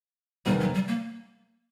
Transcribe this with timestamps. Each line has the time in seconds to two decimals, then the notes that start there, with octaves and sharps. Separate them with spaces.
0.46 E2 C3 D#3 G3
0.60 F#3
0.74 G3
0.88 A#3